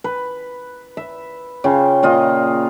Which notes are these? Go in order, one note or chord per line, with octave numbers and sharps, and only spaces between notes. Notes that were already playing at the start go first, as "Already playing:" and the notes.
B4
E5
C#3 F4 G5
A#2 F4 D#5